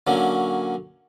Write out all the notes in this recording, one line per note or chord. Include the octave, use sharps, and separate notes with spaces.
D3 F#3 A#3 C#4